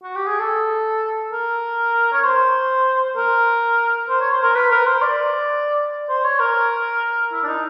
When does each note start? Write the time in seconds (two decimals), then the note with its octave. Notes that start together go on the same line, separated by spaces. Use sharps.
0.03 F#4
0.15 G4
0.27 G#4
0.39 A4
1.32 A#4
2.12 C#5
2.24 C5
3.16 A#4
4.09 C5
4.21 C#5
4.31 C5
4.43 A#4
4.55 B4
4.70 A#4
4.86 C5
5.01 D5
6.09 C5
6.24 C#5
6.39 A#4
7.32 E4
7.43 D4
7.48 D#4